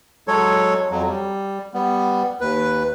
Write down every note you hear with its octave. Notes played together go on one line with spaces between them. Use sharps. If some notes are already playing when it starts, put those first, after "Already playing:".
F#3 G#3 A4 C#5
F2 F#3
G3
G3 B3
D#2 B4